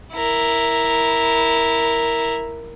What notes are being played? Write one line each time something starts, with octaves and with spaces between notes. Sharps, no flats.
E4 A#4